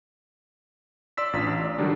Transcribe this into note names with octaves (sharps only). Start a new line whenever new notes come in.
D5 C6 E6 B6
A1 D4 F4 A#5 B6
D5 E6
D3 D#3 F#3 G3 D4